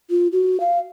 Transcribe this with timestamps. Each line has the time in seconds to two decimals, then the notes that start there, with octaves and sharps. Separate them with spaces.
0.10 F4
0.32 F#4
0.60 F5